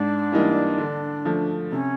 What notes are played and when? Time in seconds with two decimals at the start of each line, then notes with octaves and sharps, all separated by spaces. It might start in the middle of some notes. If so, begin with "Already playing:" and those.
Already playing: G#2 D4
0.32 E3 G3 A#3 D#4
0.78 D3
1.25 F3 A3
1.72 C3 C#4